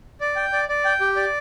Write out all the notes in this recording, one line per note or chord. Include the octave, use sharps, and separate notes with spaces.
D5
G5
D5
D5
G5
G4
D5